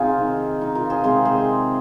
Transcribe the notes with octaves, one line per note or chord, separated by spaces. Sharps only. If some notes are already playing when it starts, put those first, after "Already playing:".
Already playing: C3 D#4 F4 G#4 C5
D#3 C4
D#4
F4 A#4
G#4 C5
C3 G#3 C4 G#4 C5
G#4 C5